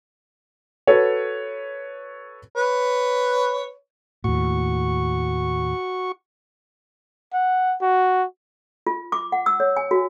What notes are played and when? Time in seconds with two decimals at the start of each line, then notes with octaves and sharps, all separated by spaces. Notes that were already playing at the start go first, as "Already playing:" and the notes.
0.87 F#4 A4 B4 C#5
2.55 B4 C#5
4.24 D#2 A2 F#4 C#6
7.33 F#5
7.81 F#4
8.86 F4
9.12 D6
9.32 F#5
9.46 E6
9.60 C#5
9.77 G#5
9.91 F#4